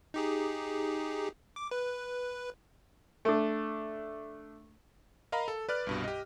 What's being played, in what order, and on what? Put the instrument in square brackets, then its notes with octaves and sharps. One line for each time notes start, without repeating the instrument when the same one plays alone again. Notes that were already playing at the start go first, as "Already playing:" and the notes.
[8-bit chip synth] D#4 G4 G#4
D6
B4
[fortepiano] A3 D4
[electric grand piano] A#4 D#5 F5 A#5 B5
A4
B4 D5 F6 F#6
C2 G2 B2
G4 D#5